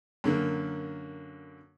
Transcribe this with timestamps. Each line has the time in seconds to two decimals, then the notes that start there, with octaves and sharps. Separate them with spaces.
0.24 F#2 D3 A#3